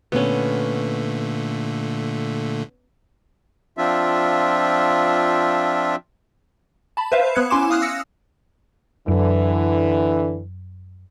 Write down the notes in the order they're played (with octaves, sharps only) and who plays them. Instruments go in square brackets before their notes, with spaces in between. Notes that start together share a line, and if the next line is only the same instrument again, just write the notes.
[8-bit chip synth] A#2 D3 A3 [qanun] B3 C#4
[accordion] F3 C4 D4 F4 E5
[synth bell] A5 B5
B4 C5 E5 F5
B3 F#6 G#6 C#7
C#4 E4 G#5 C6 D6 E7
F5 D#6 F6 F#6 C7
E6 A#6 C#7
[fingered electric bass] F#2 [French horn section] D3 E3